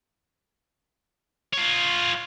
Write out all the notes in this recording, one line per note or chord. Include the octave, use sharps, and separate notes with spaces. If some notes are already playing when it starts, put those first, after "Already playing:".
F4 C#5